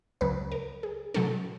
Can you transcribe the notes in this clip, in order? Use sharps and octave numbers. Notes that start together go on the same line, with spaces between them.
C#2 C#3 F#3 B4
A#4
G#4
B2 F#3 A3 C#4 A4